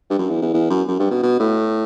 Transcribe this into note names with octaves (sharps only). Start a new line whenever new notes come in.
G2
F#2
E2
E2
E2
F#2
F#2
G2
B2
B2
A2